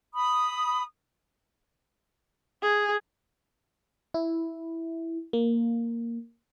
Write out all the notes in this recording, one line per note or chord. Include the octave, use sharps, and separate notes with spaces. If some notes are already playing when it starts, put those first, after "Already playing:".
B5 D#6
G#4
E4
A#3